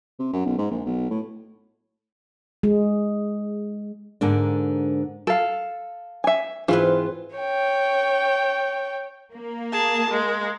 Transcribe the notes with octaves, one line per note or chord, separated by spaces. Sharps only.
C3
F#2
B1
G#2
A#1
B1
A2
G#3
G#2 D3 A#3 D4
A4 F5
E5 G#5
G#2 E3 C4 F4 B4
C#5 G5
A#3
G#4 A5
G#3